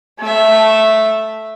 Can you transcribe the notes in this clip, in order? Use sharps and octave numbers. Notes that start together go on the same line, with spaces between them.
A3 E5